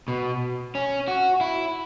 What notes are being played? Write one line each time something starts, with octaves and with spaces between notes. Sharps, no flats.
B2
C#4
F#4
E4